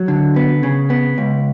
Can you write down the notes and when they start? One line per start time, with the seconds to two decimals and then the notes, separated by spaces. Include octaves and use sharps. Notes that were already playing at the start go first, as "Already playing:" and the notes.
Already playing: F#3
0.08 D3
0.36 B3
0.63 C#3
0.90 B3
1.18 C#2